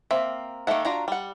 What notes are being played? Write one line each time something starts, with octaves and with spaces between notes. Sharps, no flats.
A#3 C4 E5
D#3 A#3 A4 E5 F#5
D4 F4 F#4 A#5
G3 F#5